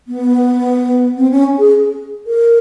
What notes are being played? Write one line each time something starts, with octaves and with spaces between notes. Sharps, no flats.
B3
C4
C#4
G#4
A#4